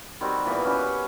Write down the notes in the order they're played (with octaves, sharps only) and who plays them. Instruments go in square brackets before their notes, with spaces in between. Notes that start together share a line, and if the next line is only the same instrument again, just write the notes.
[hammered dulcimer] D#3 G3 C4 F#4
A#2 E3 B3
C#4 F#4 G4 B4